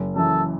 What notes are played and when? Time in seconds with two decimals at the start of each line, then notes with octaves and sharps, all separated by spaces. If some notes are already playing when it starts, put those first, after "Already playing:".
Already playing: F#1
0.16 F#2 E3 A4